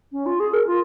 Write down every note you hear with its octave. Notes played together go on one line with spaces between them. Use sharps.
C#4
F4
G#4
A#4
F4